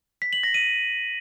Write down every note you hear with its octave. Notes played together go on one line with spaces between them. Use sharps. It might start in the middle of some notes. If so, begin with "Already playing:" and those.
B6
F#7
A#6
D#7